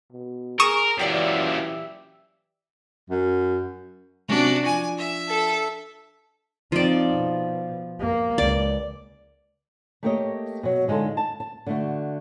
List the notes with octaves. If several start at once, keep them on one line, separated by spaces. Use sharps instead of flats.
B2
G#4 A#4 C#6 D#6 E7
F#2 A#2 E3 G4 D5 E5
F#2
C3 F#3 C#4 D4 F#4
F3 G#5
E5
A4 E6
F3 C4 D#4 D5
B2
A#3
C#2 D5
A3 A#3 G4 A#4 C#5 D#5
B2 F#3
D3 G#3 D#4 F4 A4
A5
A5
D3 A3 F#4